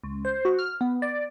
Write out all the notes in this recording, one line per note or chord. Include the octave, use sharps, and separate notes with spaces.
C#2
C5
F#4
F6
B3
D5